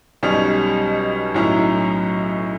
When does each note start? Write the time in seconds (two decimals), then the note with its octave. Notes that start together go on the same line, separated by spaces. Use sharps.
0.23 B1 B2 G3 C#4
1.34 B1 A2 F#3 C#4 E4